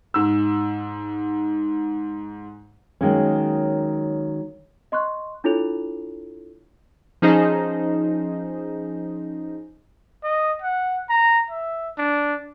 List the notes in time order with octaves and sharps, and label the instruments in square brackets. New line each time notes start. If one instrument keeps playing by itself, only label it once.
[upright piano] G#2 E6
[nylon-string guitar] D#3 F#3 G#3 A#3 C#4
[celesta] D#5 C6 C#6 F#6
D4 E4 F4 A4 C#5 F7
[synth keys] F3 C#4 D#4 G#4 C5 D#5
[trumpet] D#5
F#5
A#5
E5
D4